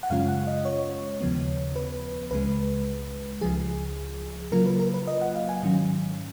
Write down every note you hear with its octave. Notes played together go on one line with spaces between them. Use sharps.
F#5
F#2 C#3 G#3 C#4 F4 F5
F#5
D#5
C#5
D#2 C#3 F3 B3
B4
C#2 C#3 G#3 B4
C#2 C#3 F3 G#4
C#3 F#3 A#3 F4 A#4
B4
A#4
B4
D#5
F#5
F5
G#5
G#2 D#3 F#3 C#4